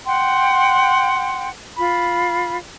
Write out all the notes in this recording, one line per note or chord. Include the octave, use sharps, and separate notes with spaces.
F#5 G5 C6
F4 B5